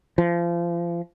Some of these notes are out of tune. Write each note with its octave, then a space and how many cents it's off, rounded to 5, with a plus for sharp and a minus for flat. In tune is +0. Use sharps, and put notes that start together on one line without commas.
F3 -30